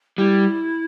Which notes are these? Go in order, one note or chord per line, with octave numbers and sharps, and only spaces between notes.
G3 E4